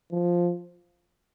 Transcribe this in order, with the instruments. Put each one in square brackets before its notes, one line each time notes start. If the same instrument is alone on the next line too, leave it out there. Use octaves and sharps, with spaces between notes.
[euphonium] F3